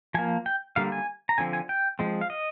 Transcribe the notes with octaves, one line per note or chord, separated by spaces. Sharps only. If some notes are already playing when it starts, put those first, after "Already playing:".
F3 A#3 G#5
G5
D3 G3 A#3 F5
G#5
A#5
D3 F3 C4 G#5
G#5
G5
F3 G#3 C4
F5
D#5